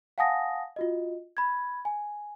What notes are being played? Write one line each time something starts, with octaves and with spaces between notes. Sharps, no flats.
F5 F#5 G#5 A5 D#6 A#6
F4 F#4 D#5
B5 G#6
G#5